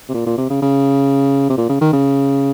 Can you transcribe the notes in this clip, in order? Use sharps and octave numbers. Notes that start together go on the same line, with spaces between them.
C3
A#2
A#2
C3
C#3
C#3
C3
A#2
C#3
D#3
C#3